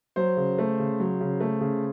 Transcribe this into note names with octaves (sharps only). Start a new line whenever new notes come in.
F#3 C5
C#3
A3
C#3
F#3
C#3
A3
C#3